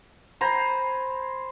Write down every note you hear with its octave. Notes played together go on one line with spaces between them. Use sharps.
C5 G#5 A#5 B5